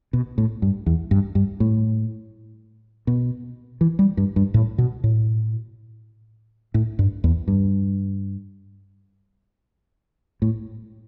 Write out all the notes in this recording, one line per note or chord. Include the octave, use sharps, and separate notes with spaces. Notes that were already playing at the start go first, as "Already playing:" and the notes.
B2
A2
G2
E2
G2
G2
A2
B2
E3
G3
G2
G2
A2
B2
A2
A2
G2
E2
G2
A2